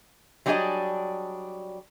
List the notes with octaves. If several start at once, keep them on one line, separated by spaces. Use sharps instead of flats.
F#3 G3 D4 G4 G#4 D#5